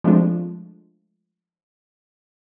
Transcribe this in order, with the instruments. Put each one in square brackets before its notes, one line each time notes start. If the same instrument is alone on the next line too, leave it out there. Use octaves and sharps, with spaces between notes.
[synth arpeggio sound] F3 G#3 A3 C4 D4 F4